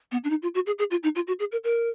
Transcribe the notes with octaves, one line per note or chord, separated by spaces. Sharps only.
B3
D4
D#4
F4
F#4
G#4
G#4
F4
D#4
F4
F#4
G#4
A#4
A#4